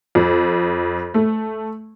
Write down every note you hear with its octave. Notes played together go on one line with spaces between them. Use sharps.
F2
A3